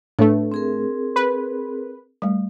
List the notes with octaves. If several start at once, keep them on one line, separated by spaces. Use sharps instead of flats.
A2 A3 D4 B4
C4 G#4 A#4
B4
G3 A3